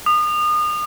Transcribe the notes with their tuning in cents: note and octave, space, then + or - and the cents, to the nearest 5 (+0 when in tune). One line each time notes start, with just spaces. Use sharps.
D#6 -35